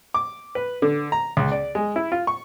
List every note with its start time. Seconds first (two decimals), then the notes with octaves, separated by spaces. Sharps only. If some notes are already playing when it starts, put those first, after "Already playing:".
0.14 D6
0.55 B4
0.82 D3
1.12 A#5
1.37 C#2
1.52 D5
1.75 G#3
1.96 E4
2.12 F4
2.27 C#6